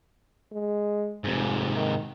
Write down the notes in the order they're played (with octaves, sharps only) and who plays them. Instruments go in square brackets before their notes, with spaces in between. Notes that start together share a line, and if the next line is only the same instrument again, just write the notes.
[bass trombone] G#3
[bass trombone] F1 [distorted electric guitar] G#2 C3
[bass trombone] D#3